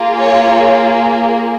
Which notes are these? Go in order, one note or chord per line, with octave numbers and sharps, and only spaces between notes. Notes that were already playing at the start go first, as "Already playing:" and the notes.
Already playing: A#3 F4 G#4
C#5